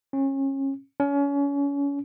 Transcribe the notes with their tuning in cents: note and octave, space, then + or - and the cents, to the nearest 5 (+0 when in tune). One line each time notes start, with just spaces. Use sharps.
C#4 -30
C#4 +30